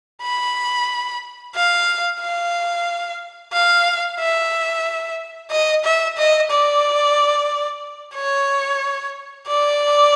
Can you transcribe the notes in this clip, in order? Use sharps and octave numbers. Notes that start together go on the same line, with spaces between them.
B5
F5
F5
F5
E5
D#5
E5
D#5
D5
C#5
D5